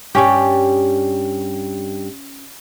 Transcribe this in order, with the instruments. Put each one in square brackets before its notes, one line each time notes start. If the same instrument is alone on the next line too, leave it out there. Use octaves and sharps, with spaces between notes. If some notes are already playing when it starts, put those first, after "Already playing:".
[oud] G2 G3 [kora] C#4 G4